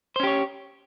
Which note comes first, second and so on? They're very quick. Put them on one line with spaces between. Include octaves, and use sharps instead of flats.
C5 C#4 G4 C#5